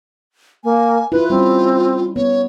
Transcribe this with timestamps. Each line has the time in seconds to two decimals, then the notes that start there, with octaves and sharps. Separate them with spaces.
0.64 A#3 G#5
1.12 E4 F4 B4
1.30 G3 C4 C#4
2.16 B3 C#5